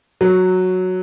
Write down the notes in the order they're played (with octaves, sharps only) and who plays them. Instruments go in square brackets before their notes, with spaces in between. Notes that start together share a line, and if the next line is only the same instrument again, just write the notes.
[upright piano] F#3